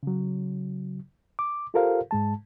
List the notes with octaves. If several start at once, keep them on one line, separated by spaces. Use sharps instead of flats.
C#3 F#3
D6
F4 G4 A4 A#4 C5 F5
G#2 G#3 A5